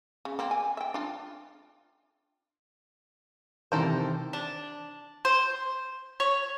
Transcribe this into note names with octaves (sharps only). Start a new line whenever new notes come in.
C#3
A#3 C4
G#5
E5 G5
D4 F4
C3 D#3 E3 A4 A#4 C5
D4
C5
C#5